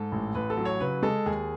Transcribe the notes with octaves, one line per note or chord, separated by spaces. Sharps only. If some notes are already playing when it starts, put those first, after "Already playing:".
Already playing: G#2 A4
A1
A1 B4
A4
F#3
C#5
C#3 B4
G#3 A4
D#2 G#4